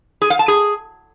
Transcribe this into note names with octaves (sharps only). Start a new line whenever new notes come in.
G#4
F5
A5
G#4